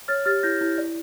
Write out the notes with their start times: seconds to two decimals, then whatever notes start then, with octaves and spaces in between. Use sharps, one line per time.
0.08 C#5 F6 A6
0.25 G4 F6 A6
0.43 E4 G6 A#6
0.61 E4
0.78 D5